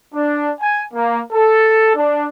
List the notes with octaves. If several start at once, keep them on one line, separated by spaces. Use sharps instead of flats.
D4
G#5
A#3
A4
D4